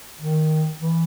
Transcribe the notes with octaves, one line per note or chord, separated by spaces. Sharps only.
D#3
E3